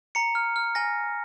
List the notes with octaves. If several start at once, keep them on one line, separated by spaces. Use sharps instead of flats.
A#5 C#7
F6
F6
G#5 A#6